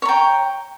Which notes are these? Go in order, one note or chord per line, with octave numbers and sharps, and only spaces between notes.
C#5 G5 A#5